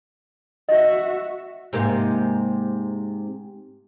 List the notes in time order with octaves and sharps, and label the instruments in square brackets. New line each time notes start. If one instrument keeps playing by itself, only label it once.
[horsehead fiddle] F#4 E5 [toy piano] D#5
[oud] G#2 C3 A#3